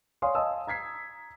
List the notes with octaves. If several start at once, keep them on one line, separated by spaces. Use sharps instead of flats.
C#5 D5 F5 G#5 C6 D#6
D#5 F5 G#5 A5 D#6 E6
A#5 G#6 B6 C7